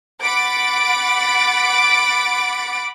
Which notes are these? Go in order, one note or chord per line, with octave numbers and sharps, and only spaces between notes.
F#5 B5 D6 A6 D7